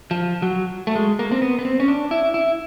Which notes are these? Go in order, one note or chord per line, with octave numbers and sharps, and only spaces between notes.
F3
F#3
A3
G#3
A#3
C4
B3
B3
C4
C#4
D4
E4
E4